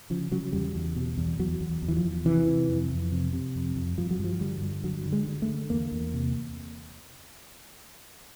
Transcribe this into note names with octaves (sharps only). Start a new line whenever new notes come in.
C#3 F3
C#3 F#3
E2 G3
E2
B2
E2
E2 F#3
E2
E2
E3
F3
E2
C3 E3
C3
F2
F2
C3
C3
F2
F2
G2 F3
F#3
G2
F3
D3 G3
G2
D3 F#3
D3
G#3
D3
A3
D3
E2 A#3
E2
C3